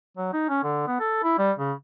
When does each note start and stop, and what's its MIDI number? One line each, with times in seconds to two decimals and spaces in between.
0.17 0.29 54
0.33 0.46 63
0.49 0.63 61
0.64 0.83 50
0.87 0.98 59
1.00 1.18 69
1.23 1.34 64
1.38 1.52 55
1.58 1.73 49